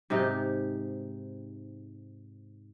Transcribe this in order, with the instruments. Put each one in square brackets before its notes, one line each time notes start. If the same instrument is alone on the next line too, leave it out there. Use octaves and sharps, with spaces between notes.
[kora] G#2 C3 D#4 G4